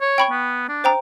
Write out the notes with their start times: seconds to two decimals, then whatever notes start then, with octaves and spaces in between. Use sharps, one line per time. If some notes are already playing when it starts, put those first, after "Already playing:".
0.01 C#5
0.18 G5 B5 C#6
0.31 B3
0.69 D4
0.84 C5 G5 A#5